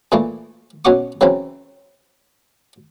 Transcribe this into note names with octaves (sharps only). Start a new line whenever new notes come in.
A#2 E3 A3 A#3
B2 C#4 F#4 F#5 C#6 D6
C#3 E3 F#3 C4